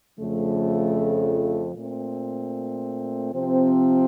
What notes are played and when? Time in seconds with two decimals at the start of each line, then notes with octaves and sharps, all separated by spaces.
0.17 F2 C#3 F3 A3
1.75 A#2 A3 C4
3.32 C3 F3 C4